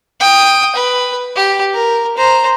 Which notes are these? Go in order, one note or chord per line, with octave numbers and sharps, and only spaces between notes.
G5 D#6
B4
G4
A#4
C5 A#5